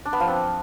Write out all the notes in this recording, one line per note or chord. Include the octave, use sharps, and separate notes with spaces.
D4
B3
F3
C4